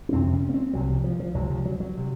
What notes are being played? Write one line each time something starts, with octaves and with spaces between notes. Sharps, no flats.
C#4
F2 C3 C4
C#4
A#3
C4
C2 C3 F#3
F3
F3
F3
C#2 C3 F#3
F3
F#3
F#3
C3